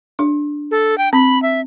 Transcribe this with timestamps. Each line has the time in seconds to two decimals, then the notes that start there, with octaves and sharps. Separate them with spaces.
0.19 D4
0.71 A4
0.98 G5
1.13 C4 B5
1.43 E5